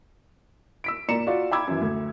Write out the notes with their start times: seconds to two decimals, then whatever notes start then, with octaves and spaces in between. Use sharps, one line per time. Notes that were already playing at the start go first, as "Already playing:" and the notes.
0.84 E6 B6 D7
1.09 A#2 D5 A#5 C#7 E7
1.27 F4 F#4 D5 F5
1.51 G5 A#5 B5 D6 E6 G#6
1.68 F#2 E3
1.81 D2